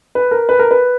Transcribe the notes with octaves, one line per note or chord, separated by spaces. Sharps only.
B4
A#4
B4
A#4
B4